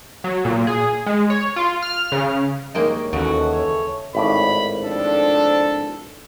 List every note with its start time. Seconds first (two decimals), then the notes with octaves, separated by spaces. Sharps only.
0.24 F#3
0.45 A#2
0.67 G#4
1.06 G#3
1.30 C#5
1.56 F4
1.82 F6
2.12 C#3
2.75 G2 D#3 G#3 A#3 C#5 D#5
3.13 D#2 C#3 E3 F#4 A4
3.52 C#5
4.15 G#1 A2 D5 B5
4.84 F2 F3 D4 A4